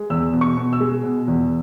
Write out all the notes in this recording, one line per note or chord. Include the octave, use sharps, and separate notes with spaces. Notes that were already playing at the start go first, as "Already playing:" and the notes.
Already playing: G#3
E2 E6
B2
C#6
B2
E6
G#3
B2
E2